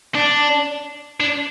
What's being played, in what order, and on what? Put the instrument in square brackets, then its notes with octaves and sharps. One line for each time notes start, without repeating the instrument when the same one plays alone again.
[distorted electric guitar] D4
D4